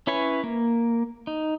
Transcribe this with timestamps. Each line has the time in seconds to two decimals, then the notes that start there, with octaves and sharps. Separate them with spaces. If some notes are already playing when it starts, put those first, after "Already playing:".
0.07 C#4 E4 B4 C#5 G#5
0.44 A#3
1.27 D#4